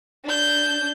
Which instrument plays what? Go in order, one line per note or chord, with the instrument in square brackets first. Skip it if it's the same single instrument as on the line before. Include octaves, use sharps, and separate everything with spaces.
[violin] D4 G6